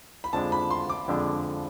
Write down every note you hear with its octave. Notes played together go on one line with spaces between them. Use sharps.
B5
F2 D3 F3 G#3 D4 A5
B5
C6
D6
F2 D3 F3 G#3 D4